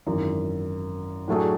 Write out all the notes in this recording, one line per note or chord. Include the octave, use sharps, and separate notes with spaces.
G#1 F#2 E3
A2 F#3 A3 D4 G#4